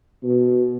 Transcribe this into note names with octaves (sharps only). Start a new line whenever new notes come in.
B2